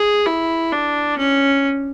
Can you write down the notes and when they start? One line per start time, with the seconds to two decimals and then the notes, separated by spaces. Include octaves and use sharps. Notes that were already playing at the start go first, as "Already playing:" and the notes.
Already playing: G#4
0.26 E4
0.72 D4
1.18 C#4